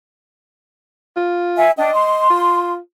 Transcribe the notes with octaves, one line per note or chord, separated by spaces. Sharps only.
F4
E5 G#5
D4 D#5 G5
C6
F4